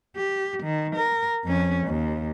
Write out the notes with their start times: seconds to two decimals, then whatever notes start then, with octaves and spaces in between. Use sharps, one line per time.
0.17 G4
0.63 D#3
0.96 A#4
1.45 F2 C#4
1.87 D#2